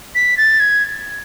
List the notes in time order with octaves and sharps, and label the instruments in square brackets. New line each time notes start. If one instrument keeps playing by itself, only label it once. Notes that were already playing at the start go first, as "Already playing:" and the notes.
[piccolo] B6
A6
G#6